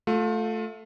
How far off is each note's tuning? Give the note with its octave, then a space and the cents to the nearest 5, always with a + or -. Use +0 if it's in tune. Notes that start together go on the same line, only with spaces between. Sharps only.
A3 +0 F4 +30